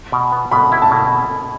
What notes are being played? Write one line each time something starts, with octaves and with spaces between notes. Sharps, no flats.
B2
B3
B2 B5
E4
A5
B2